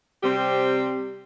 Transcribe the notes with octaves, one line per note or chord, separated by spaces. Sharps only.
C3 G3 C4 G4